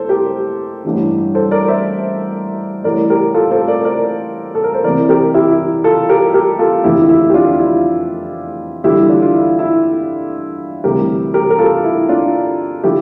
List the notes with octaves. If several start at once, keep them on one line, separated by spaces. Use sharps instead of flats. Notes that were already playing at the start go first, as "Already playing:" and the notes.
Already playing: A2 A4 C5
G4 A#4
A1 G2 E3 G3
A4 C5
A#4 D5
C5 E5
A1 A2 G3 A#4 D5
G4 A#4
F4 A4
A4 C5
A#4 D5
A#4 D5
A4
A#4
C5
E2 C3 E3 A#4 D5
G4 A#4
E4 G4
E4
F4 A4
G4 A#4
G4 A#4
F4 A4
F1 E2 D3 F3 E4 G4
E4
G4
D4 F4
F4
E4
E2 D3 G3 E4 G4
D4 F4
F4
E4
E4
D2 C3 E3 G3 G4 A#4
G4 A#4
A#4
F4 A4
E4
D4 F4
D3 F3 E4 G4